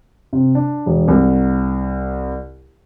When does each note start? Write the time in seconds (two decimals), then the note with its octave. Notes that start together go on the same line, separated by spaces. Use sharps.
0.33 C3
0.55 D4
0.86 E1
1.08 C2